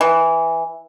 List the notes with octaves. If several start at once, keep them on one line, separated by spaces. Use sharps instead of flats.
E3